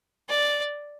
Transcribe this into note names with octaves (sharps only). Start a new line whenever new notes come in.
D5